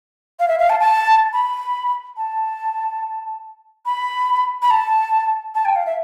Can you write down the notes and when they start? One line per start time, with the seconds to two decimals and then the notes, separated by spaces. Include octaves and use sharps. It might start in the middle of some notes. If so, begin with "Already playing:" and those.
0.39 F5
0.48 E5
0.59 F5
0.69 A5
0.80 A5
1.33 B5
2.16 A5
3.85 B5
4.62 B5
4.70 A5
5.54 A5
5.65 G5
5.75 F5
5.86 E5